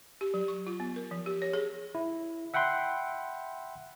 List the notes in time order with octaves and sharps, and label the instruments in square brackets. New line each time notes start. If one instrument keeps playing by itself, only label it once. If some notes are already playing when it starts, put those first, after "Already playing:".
[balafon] G4
F#3
C#6
F4
B3
A#4
F3
G4
C#5
G#4
[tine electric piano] E4
E5 F#5 G5 B5 C6